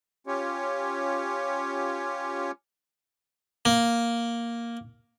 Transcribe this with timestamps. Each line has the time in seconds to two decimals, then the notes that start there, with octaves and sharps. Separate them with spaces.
0.27 C#4 F4 G4 C#5
3.65 A#3